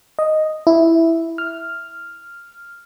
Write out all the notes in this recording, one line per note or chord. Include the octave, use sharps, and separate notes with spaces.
D#5
E4
F6